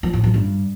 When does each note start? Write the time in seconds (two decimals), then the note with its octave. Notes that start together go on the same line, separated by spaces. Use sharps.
0.03 F3
0.13 A2
0.24 F3
0.34 G2